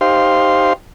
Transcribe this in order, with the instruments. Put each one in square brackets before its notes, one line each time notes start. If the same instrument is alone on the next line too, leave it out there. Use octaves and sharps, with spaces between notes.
[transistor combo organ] D#4 G4 C5 F5 C6